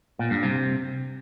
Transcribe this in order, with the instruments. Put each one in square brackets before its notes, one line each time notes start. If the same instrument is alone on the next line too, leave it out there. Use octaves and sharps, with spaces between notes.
[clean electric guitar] A#2
G2
C3